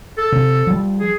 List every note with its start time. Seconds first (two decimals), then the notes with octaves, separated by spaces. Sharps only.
0.18 A4
0.32 C3
0.67 F3 G3
1.00 G#4